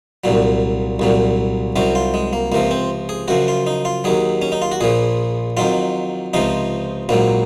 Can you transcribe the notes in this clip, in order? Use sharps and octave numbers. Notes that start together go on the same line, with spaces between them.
C2 A#2 F#3
C2 A#2 F#3
C2 C3 F#3 C#4
F4
G#3
A#3
C#2 C3 F3 A#3
C4
G#4
F#2 C#3 F3 F#4
F4
D#4
F4
D#2 D#3 F#3 G#4
C#4
D#4
F4
F#4
A#1 A#2 F3 G#4
F2 D#3 F#3 F4
C#2 C3 F3 D#4
A#1 G#2 F#3 A#3